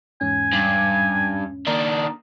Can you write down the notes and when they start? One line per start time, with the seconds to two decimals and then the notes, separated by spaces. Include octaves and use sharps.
0.21 E2 G#2 C#4 G#5
0.53 G2
1.67 D#3 A#3 D4 A#5 D#6